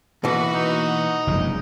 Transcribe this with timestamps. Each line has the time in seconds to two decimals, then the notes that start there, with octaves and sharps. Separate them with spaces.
0.24 B2 E3 A#3 F#4 B4
0.55 D#4
1.27 F#1 G2 C3 F3 G#3